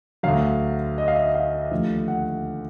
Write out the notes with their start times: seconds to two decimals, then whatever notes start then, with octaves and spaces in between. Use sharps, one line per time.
0.23 D2 D3 F#3 F5
0.98 D#5
1.08 F5
1.16 E5
1.35 F5
1.71 D#2 D3 F3 A3
2.08 F#5